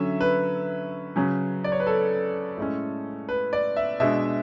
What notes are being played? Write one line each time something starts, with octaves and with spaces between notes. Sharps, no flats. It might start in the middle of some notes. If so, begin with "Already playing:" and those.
Already playing: D3 F#3 C#4 E5
B4
C#3 F#3 C#4
D5
C#5
B4
A4
A2 G#3 C#4
B4
D5
E5
B2 G#3 D4 E5